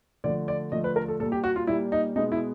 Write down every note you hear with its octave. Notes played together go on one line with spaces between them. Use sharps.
D3 F3 A3 D5
D5
D3 F3 A3 D#5
B4
A#4
A4
A#2 G3 A#3 A4
G4
F#4
F4
A#2 G3 A#3 E4
D#4
B2 G#3 B3 D#4
E4